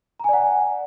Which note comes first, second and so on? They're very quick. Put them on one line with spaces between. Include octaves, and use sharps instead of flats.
A#5 G#5 D5 F#5